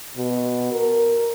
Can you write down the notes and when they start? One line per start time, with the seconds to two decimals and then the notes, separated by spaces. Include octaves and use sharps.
0.17 B2
0.72 A#4